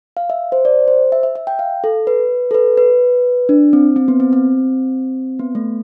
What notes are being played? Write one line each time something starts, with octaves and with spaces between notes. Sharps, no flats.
F5
E5
C5
D5
C5
E5
E5
E5
G5
F5
A4
B4
A4
B4
B4
D4
C4
C4
B3
C4
C4
B3
A3